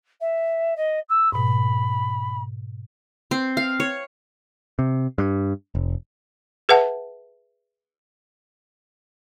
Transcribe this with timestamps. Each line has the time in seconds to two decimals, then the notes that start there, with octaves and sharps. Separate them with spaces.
0.20 E5
0.76 D#5
1.09 E6
1.32 G#2 B2 B5
3.31 C4
3.57 F5
3.80 C#5
4.79 C3
5.18 G2
5.75 F1
6.69 G#4 B4 E5 F#5 A5